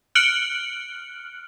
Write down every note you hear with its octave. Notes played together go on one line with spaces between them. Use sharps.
F6 F#6 C#7 D7 F#7 G7